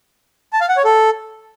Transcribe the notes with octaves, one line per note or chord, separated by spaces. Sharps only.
A5
F5
F#5
C#5
A4